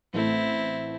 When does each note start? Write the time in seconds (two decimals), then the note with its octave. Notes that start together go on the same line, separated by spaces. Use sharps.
0.14 A1 A2 A3 C4 E4